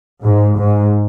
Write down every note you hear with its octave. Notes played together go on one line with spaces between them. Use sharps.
G#2
G#2